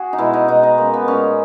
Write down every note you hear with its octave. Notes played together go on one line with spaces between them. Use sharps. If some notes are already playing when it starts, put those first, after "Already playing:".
Already playing: F#4 G#4
D#4
B2 G#3 E4
D#4
B2 G#3 D#4
D#4
C#3 G#3 A#3
B3
A#2 G#3 C#4